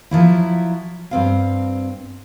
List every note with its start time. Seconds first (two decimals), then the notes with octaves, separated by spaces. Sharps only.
0.11 F3 F#3 E4
1.11 G2 C4 F5